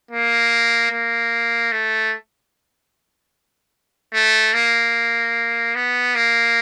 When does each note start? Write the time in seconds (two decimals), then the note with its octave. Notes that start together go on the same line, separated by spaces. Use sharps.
0.11 A#3
0.91 A#3
1.72 A3
4.14 A3
4.54 A#3
5.75 B3
6.15 A#3